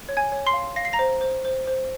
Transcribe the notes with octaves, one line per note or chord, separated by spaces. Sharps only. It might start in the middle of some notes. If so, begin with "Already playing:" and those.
C#5
G#5 G#6
C#5
C6 C7
F5
F5 A#6
C7
A#5 A#6
C5
C5
C5
C5